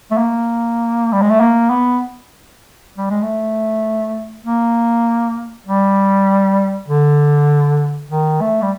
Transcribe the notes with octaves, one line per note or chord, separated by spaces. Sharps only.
A3
A#3
G3
G#3
A3
A#3
B3
G3
G#3
A3
A#3
G3
D3
D#3
A3
G3